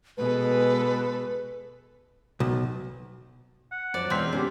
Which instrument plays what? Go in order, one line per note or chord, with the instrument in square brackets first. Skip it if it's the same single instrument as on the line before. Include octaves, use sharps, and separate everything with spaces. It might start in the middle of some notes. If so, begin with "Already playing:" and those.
[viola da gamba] B2 G#3 A4 [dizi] B4
[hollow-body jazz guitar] B1
[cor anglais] F#5
[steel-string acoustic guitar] F#2 F3 F#3 [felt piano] C5 [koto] D5
[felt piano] E1 G6 B6 [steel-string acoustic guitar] E2 G#3 C#4 [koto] C4 [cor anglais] F4
[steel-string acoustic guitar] D3 B3 [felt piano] C#4 G4 [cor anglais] D4